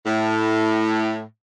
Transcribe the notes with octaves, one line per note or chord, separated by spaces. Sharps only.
A2